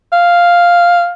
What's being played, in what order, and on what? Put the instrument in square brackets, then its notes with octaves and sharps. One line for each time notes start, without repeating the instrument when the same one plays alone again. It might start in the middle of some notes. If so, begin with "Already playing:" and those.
[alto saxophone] F5